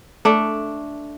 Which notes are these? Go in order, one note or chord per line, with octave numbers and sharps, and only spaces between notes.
A3 D4